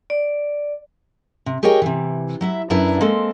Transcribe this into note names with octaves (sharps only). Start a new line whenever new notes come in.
D5
C3
G4 G#4 A#4 C#5 D#5 G5
C3 E3
F#3 E4 E5
F#2 D4 E4 B4 D5 A#5
G#3 A#3 C4 A4